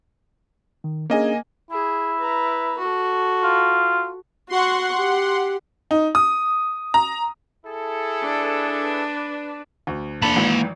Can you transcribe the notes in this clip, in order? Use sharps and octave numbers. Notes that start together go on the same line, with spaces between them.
D#3
A#3 C#4 D4 G#4 D#5 G#5
E4 G#4
B4 A#5
F#4 A4
F4
F#4 F#5 C6 C#6
G4
D#4
D#6
A#5
E4 G#4 A4
D4 B4
D2
F1 A#3 D4 A5 B5
G#1 G#2 E3